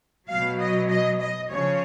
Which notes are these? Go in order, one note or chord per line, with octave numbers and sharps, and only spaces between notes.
B2 F#3 F5
D#5
D#5
D#5
C#3 F3 C#5